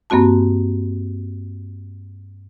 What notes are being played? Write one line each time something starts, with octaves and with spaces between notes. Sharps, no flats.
G2 A#3 C4 F#4 A5